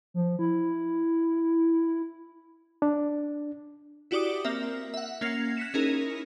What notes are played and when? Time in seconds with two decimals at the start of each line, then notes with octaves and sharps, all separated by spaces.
0.14 F3
0.39 E4
2.82 D4
4.11 E4 F#4 G4 D5 D6 D#6
4.44 A#3 C4 A#4 E5
4.94 E5 F#5
5.21 A#3 C#4 G#6 C7 F7
5.57 F#6 A#6 B6 C#7 E7
5.74 C#4 D#4 E4 G#4 A#4